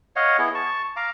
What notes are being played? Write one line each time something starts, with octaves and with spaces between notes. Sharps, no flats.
C#5 D#5 F5 F#5
B3 E4 G#4
A5 C#6
F5 A#5 D6